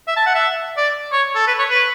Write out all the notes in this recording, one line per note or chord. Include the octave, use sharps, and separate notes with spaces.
E5
A5
F#5
E5
D5
C#5
A4
B4
C#5
B4